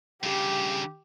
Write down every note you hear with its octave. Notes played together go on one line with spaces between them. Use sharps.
G2 C#3 G4